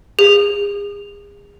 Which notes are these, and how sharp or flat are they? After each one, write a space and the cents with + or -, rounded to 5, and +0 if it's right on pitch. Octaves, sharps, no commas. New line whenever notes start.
G#4 -35